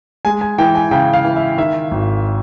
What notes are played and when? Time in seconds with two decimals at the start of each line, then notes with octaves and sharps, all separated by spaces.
0.25 G#3 G#5
0.41 G#5
0.58 E3 G5
0.75 G#5
0.91 C#3 G5
1.13 F5
1.25 E3
1.36 E5
1.58 D#3 E5
1.91 G#1